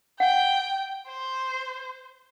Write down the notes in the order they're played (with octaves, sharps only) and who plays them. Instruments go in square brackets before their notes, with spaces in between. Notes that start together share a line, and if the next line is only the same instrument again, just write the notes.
[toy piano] F#5 [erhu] G5
[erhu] C5